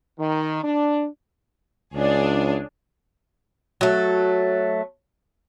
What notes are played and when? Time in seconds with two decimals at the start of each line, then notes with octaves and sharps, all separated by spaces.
0.19 D#3
0.63 D4
1.94 C#2 D4 G#4 C#5
3.81 F#3 A3